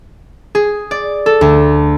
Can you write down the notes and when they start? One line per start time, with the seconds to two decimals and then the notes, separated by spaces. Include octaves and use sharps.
0.55 G#4
0.91 D5
1.26 A4
1.41 D2